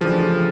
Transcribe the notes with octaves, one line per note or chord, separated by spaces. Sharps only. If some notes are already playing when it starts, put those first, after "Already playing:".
C#3 E3 F3 A3 D4 G4